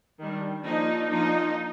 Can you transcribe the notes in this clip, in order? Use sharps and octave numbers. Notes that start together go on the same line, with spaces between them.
D#3 G3 D4
F3 A#3 D4 D#4
F3 A#3 D4 D#4